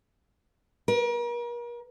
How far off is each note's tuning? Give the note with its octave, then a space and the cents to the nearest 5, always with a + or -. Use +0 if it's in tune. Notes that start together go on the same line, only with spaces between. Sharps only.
A#4 +40